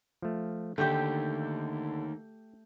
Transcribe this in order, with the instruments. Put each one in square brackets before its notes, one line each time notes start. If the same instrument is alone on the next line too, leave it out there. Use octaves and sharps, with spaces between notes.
[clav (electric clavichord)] F3 A3
[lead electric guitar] D#2 [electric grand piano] D3 G6 [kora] A3 G4 [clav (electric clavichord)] G5